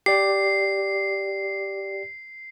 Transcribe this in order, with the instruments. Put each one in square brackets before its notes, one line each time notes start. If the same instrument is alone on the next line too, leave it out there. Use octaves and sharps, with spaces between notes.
[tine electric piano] G4 D5 [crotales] C7